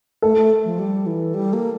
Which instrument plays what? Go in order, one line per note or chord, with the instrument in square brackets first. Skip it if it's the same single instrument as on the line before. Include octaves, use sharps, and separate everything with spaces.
[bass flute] A3 [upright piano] A4
[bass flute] A3
F3
G3
E3
G3
A#3